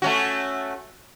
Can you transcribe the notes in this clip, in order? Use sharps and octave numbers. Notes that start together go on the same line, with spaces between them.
A3 C#4 F#4